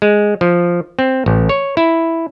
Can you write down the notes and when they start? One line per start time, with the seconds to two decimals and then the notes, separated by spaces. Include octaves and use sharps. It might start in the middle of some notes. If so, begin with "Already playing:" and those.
0.02 G#3
0.41 F3
0.99 C4
1.26 A1
1.49 C#5
1.77 E4